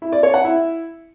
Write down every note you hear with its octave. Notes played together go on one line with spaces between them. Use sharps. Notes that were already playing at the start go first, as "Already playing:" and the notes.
E4
D5
C#5
F#5
E4